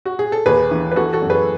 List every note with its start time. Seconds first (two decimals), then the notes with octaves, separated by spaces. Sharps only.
0.05 F#4
0.19 G#4
0.32 A4
0.46 D#2 G#4 B4
0.71 E3
0.92 B4
0.96 E3 F#4 A4
1.13 F#4 A4
1.22 F#2
1.30 G#4 B4